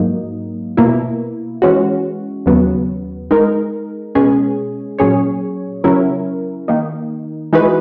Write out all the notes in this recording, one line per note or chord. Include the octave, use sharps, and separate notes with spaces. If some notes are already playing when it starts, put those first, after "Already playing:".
Already playing: G#2 F#3 A#3 D#4
B2 A#3 E4
E3 G#3 C#4 F#4
D#2 C#3 F#3 B3
G#3 D#4 A#4
B2 G#3 C#4 G#4
A#2 F#3 C#4 G#4 C#5
C#3 F#3 C#4 E4 A#4
D#3 A#3 D#4
E3 G#3 D#4 F#4 B4